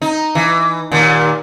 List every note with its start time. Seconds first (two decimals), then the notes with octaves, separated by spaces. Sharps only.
0.02 D#4
0.35 E3
0.92 D#2 A#2